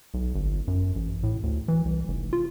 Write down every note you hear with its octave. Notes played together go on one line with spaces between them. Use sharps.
B1
G1
F#2
A1
A2
D2
E3
C2
F1
F4